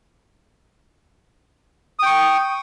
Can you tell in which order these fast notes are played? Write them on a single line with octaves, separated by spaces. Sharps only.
D#6 G5 C#6